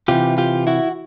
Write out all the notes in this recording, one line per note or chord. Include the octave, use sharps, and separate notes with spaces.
C3 E3 F4 G4
F4 G4
E4 F#4